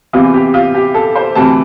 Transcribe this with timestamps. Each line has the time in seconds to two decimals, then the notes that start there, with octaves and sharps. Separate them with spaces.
0.13 E2 C3 E3 F4
0.34 G4
0.54 F4
0.74 G4
0.94 A4
1.15 C5
1.35 D2 C3 E3 A5